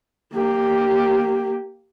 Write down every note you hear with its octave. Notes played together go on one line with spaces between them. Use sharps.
A#3 G4